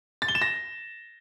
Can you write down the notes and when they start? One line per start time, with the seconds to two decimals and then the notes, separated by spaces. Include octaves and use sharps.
0.22 A6
0.28 G7
0.35 E7
0.42 A#6